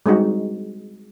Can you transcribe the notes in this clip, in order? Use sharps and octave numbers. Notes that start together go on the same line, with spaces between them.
G3 G#3 C4 D#4 F#4